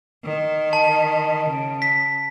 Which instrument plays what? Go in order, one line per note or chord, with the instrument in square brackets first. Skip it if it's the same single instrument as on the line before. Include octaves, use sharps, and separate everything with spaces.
[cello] D#3
[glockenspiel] A5
[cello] C#3
[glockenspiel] B6